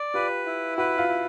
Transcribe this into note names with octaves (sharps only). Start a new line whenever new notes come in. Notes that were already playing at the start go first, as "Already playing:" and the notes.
Already playing: D5
F4 G4 B4
E4
F#4 B4
F4
E4